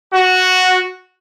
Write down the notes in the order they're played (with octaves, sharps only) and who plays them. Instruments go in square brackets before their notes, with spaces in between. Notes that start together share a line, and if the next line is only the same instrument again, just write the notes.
[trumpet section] F#4